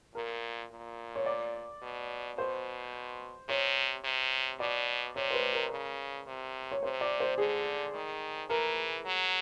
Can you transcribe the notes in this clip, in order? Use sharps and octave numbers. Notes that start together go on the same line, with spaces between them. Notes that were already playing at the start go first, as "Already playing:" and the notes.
A#2 A#4
A#2
C#5
D5
B2
B2 C5
C3 C#5
C3
B2 D5
C3 C#5
C5
B4
A#4
C#3
C3
C#5
C3 C5
D5
C5
D3 G#4
D#3
E3 A#4
F#3